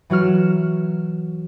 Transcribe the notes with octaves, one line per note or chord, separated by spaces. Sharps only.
E3 F#3 F#4 F6 E7